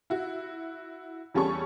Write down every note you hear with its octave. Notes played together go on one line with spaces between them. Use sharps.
E4 F#4
E2 G3 C#4 G#4 A4 C#6